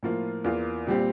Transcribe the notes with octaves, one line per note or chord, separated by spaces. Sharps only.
A2 F3 A#3 F4
E2 E3 A#3 F4
A#2 G3 C4 G4